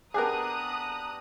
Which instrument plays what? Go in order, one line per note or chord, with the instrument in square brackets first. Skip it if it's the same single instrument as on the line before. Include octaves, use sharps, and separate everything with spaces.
[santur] B3 D4 G4 [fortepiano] G#4 A#4 [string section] A#5 D#6 F#6